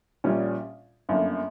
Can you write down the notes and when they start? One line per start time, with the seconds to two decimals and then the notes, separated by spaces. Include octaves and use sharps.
0.24 A#1 A#2 G3 C#4
1.09 G1 F#2 D3 A#3